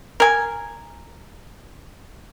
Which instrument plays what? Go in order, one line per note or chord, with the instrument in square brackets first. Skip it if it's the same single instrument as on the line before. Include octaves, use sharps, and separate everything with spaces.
[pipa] A#4 G#5